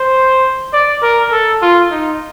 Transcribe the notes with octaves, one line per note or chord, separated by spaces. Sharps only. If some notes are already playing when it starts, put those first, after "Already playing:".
Already playing: C5
D5
A#4
A4
F4
D#4